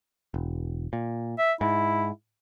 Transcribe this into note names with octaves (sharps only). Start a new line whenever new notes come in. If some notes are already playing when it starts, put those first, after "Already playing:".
E1
A#2
E5
G#2 E4